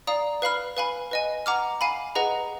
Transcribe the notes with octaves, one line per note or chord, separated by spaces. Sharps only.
D5 F5 A#5 D#6
B4 F5 B5 F6
B4 F5 G#5 B5
B4 D#5 G#5
F#5 A#5 D6 F6
F5 G#5 B5
G#4 B4 D#5 F#5 A#5